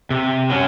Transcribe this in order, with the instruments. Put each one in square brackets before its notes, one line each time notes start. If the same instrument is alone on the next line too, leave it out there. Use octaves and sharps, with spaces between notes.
[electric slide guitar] C3
F#3 C#4